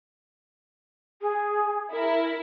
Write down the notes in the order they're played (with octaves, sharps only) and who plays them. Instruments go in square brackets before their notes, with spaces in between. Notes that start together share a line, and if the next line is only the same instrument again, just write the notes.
[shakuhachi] G#4
[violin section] E4 [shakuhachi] A#4